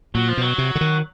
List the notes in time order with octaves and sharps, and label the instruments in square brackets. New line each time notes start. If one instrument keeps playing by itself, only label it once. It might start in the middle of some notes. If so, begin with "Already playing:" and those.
[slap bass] A#2 [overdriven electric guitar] F#3
[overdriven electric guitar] F3
[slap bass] B2 [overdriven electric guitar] F#3
[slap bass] C3
D3
D#3